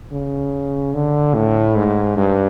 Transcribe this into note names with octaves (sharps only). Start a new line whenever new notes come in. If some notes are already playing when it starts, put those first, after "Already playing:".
C#3
D3
A2
G#2
G2